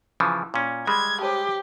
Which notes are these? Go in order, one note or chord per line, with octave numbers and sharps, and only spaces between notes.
C#3 E3 F3 E4
A#2 C#4
G3 G#3 B5 G#6
G4 C5 C#5 A5